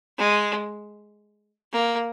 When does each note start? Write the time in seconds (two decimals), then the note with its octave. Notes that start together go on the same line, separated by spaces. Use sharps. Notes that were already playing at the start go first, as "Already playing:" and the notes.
0.18 G#3
1.72 A#3